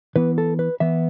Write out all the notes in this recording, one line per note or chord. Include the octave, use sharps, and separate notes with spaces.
E3 B3 B4
A4
B4
E3 B3 E5